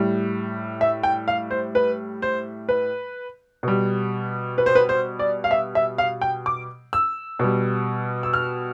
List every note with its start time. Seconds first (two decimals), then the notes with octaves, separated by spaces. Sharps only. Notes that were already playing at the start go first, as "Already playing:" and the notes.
Already playing: A2 G3
0.81 E5
1.03 G5
1.28 F5
1.51 C5
1.75 B4
2.22 C5
2.69 B4
3.63 B2 G3
4.58 B4
4.66 C5
4.75 B4
4.89 C5
5.19 D5
5.44 F5
5.51 E5
5.75 E5
5.98 F5
6.21 G5
6.46 D6
6.93 E6
7.39 B2 G3
8.23 E6
8.33 F6